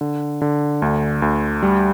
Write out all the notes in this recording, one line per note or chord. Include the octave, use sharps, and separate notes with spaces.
D3
D3
D2
D2
G3